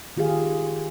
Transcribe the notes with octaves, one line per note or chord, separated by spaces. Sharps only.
D#3 F4 G4 G#4 F5